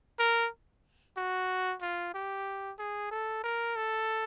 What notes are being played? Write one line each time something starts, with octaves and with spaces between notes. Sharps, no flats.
A#4
F#4
F4
G4
G#4
A4
A#4
A4